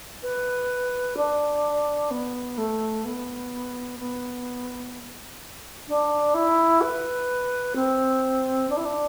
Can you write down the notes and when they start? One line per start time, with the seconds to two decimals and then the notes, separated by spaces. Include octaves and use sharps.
0.22 B4
1.17 D4
2.11 B3
2.57 A3
3.05 B3
4.00 B3
5.88 D4
6.34 E4
6.81 B4
7.75 C4
8.69 D4
8.77 E4
8.85 D4